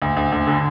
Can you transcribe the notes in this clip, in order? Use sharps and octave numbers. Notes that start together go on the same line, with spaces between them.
D2
D2
D2
D3